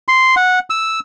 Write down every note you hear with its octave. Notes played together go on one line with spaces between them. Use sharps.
C6
F#5
E6